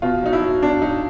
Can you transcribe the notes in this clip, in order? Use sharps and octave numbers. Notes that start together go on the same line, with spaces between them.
B2 F4
F#3 D#4
E4
F#3
B2 D4
F#3 D#4